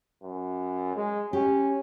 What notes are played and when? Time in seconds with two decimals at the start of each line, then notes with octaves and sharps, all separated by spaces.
0.23 F#2
0.96 G#3
1.33 C#4 G4